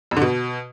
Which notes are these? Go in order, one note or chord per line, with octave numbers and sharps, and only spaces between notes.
F2
D3
B2